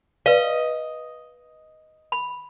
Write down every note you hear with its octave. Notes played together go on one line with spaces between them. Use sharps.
B4 D#5 F5
B5